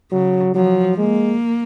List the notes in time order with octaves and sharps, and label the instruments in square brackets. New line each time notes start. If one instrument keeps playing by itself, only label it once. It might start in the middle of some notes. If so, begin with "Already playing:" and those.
[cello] C#3 [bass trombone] F#3
[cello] F3 [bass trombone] F#3
[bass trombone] G#3 [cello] A#3